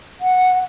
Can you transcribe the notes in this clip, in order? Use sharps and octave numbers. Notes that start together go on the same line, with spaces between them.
F#5